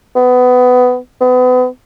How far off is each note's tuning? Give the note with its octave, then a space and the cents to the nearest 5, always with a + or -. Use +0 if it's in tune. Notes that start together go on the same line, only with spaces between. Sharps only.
B3 +20
B3 +35